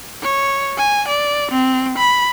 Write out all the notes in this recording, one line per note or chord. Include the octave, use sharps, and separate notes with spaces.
C#5
G#5
D5
C4
B5